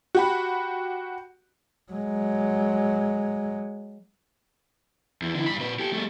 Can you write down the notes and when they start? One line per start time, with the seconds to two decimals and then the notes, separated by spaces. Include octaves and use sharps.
0.15 F#4 G4 B5
1.92 F#3 G#3
5.22 E2
5.35 D3 E3
5.46 G2 B5
5.60 A#2 B4
5.79 G4 A4
5.93 G3 A3